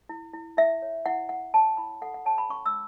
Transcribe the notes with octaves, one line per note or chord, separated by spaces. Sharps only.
E4
E4
E4 E5
C#5
E4 F#5
E4 F#5
C#5 A5
E4 B5
A4 F#5
F#5
C#5 A5
B5
C#4 C#6
E6